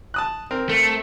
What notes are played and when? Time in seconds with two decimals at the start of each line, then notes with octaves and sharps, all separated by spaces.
0.14 A5 D#6 F#6
0.51 C4 A#4
0.69 A3